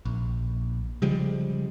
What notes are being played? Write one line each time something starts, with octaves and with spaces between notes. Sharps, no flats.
A#1
C#3 F3 G3 G#3